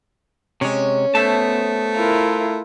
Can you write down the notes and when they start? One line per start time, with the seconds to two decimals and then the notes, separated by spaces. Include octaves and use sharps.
0.61 C3 G#3 C#4 C#5
1.15 A3 B3 C5 E5 A5
1.95 E4 F4 A#4